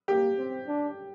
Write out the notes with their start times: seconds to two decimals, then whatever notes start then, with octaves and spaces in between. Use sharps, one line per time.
0.08 A#3 G4
0.38 C4
0.68 D4